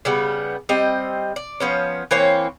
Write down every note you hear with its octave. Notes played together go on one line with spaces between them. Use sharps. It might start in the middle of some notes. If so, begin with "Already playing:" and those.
C#3 G3 B3
G3 C4 D#5
D5
F3 B3 C#4
E3 A#3 C4 C#5